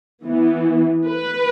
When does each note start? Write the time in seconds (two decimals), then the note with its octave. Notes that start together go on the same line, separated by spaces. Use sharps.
0.25 E3 B3
1.06 B4